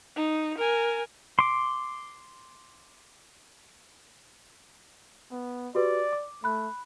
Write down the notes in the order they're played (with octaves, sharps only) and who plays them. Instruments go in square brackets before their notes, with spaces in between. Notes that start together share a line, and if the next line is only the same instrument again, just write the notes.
[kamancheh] D#4
A#4 G#5
[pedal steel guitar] C6 D6
[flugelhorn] B3
[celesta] F#4 G4 B4 [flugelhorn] D5
[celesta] D6
[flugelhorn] A3 [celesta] B5 F#6